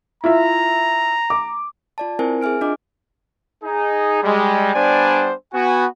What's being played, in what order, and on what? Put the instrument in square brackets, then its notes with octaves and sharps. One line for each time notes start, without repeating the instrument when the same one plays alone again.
[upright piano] E4 F4 E5 [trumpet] A#5
[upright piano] D6
[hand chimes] F4 D5 A5
C4 E4 A#4 C5 G#5
G#4 E5 G#5 F6 D7
D4 F4 D#5 D6
[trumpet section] D#4 G#4
G3 G#3
G3 B3 D4 C5 D5 G#5
B3 F#4 G#5